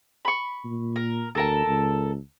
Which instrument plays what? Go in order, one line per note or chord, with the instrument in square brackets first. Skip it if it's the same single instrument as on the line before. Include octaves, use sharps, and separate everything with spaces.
[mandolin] B5 C#6
[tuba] A#2
[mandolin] A#4
[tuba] D2 [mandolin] A4 A#4 A5
[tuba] C#2